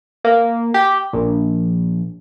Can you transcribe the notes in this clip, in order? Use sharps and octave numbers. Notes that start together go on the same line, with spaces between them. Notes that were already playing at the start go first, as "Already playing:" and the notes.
A#3
G4
A#1